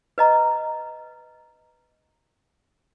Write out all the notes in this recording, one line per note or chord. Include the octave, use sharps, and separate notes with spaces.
B4 D#5 A#5